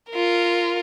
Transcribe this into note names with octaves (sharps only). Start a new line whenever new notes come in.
F4 A#4